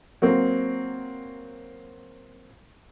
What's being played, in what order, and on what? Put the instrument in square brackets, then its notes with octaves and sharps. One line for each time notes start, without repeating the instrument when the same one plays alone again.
[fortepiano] F#3 A#3 C4